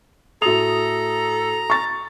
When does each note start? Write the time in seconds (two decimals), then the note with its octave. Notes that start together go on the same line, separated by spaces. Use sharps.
0.42 A2 F#4 A4 A#5 D#6 F7
1.70 C#6 A6